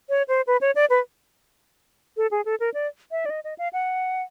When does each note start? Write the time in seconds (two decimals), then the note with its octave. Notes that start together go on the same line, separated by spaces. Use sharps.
0.09 C#5
0.28 C5
0.47 B4
0.61 C#5
0.75 D5
0.90 B4
2.17 A4
2.31 G#4
2.45 A4
2.60 A#4
2.74 D5
3.11 E5
3.26 D5
3.30 D#5
3.44 D#5
3.58 F5
3.73 F#5